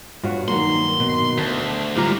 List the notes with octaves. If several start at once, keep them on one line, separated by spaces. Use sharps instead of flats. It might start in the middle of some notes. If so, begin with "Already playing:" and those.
G2 F4 F#4 C#5
D#3 F#3 A#3 C6
B2
D2 E5 A5
A2 G3 G#3 F4 G4 A#5